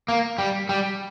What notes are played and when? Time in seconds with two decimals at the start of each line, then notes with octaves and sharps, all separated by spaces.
0.08 A#3
0.38 G3
0.69 G3